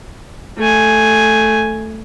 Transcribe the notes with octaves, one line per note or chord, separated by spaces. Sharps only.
A3 G#5